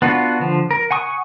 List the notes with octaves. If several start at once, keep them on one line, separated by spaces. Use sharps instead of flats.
B3 D4 F4 F#4
D3 F3
A#4
F#5 G#5 C#6 D#6